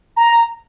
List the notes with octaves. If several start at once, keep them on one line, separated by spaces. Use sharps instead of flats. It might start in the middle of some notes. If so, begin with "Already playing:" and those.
A#5